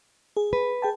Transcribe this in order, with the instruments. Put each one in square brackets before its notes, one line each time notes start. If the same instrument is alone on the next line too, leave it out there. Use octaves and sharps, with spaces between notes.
[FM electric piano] G#4
[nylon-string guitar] B4
[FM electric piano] G#4 G5 A5